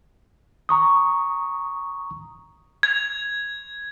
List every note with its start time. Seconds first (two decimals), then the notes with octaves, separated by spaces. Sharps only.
0.69 A#5 C#6 D#6
2.83 G#6